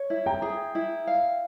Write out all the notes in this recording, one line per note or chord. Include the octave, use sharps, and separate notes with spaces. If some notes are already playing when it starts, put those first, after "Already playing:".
Already playing: C#5
E4
G5 A#5
G#4
E4
F5